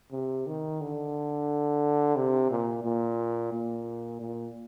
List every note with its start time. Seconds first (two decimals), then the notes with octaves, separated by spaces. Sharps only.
0.12 C3
0.47 D#3
0.81 D3
2.16 C3
2.51 A#2
2.84 A#2
3.53 A#2
4.20 A#2